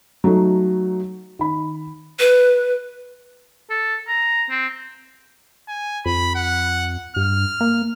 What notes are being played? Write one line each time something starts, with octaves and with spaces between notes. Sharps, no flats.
F#3 A3 D#4
D#3 B5
B4
A4
A#5
C4
G#5
F2 B5
F#5
G2 F6
A#3